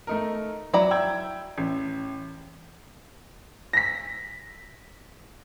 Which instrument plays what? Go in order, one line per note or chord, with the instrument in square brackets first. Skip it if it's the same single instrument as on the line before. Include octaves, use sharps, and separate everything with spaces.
[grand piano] A3 D#4 A#4
[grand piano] F#3 [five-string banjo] E4 D5 A#5
[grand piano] G5 E6 G#6
A1
A#6 B6